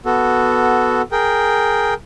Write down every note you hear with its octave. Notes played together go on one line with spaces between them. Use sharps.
B3 F#4 A4
G#4 A#4 G5